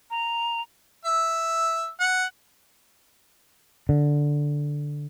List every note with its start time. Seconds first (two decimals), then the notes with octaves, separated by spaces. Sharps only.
0.11 A#5
1.05 E5
2.00 F#5
3.89 D3